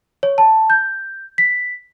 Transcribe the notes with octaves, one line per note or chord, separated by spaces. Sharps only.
C#5
A5
G6
B6